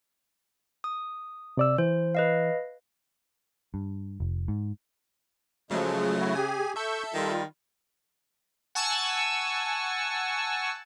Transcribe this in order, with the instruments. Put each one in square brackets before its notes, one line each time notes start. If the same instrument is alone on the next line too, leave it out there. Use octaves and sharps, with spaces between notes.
[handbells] D#6
[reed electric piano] C3 D5 E6
[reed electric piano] E3 [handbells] C5
[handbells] B4 D#5 F5
[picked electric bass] G2
F1
G#2
[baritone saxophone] C#3 [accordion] F3 G#3 [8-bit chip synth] F#3 A3
[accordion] E4 F#4
[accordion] G4 G#4 [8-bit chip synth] G#5
[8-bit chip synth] A4 E5 [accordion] C#6 E6 G6
[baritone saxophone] D#3 [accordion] G3 F4
[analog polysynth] F#5 G#5 A5 C#6 E6